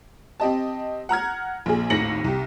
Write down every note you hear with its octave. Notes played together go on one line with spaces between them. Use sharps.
C4 G4 D#5 A5
F#5 A#5 F6 G#6
A#1 A#2 G#4
G#1 D#2 A2 A#6 C#7 F#7
C2 G4